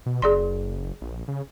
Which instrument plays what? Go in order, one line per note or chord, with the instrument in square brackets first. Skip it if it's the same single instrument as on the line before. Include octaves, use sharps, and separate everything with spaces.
[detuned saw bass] B2
[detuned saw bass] F#1 [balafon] G#4 D5 C6
[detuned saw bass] A#1
C#3